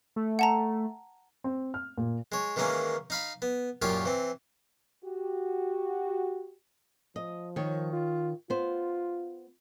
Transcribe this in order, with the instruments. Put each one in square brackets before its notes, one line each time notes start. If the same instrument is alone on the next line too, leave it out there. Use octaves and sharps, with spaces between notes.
[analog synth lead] A3
[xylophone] F#5 A5 A#5
[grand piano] C4
F6
A#2
[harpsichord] G#3 C#5
D#3 E3 G#3 A#3 C#4
D#4 F5 B5
B3
F#2 A#2 F4 G4 C#5 D6
E3 C4
[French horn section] F#4 G4
[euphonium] F3 [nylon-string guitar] D#5
[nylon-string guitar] D#3 C#5
[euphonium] F4
[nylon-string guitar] B3 C5 [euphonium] F4